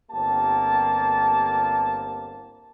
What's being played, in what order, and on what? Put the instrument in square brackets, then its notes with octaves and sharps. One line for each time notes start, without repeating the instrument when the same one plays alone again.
[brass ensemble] G1 A#3 C4 G4 A5